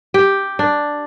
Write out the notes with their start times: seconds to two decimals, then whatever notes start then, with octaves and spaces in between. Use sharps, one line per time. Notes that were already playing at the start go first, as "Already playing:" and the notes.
0.14 G4
0.59 D4